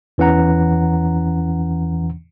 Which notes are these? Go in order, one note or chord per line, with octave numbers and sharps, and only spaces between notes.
E2 E3 C#4 F#5 A#5